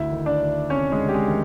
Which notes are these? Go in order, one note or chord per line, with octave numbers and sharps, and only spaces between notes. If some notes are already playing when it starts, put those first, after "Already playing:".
Already playing: D2 E4 E5
D#3
D4 D5
D2
C3 C#4 C#5
G#3 G#4
D2
G4
G#3 G#4
D#3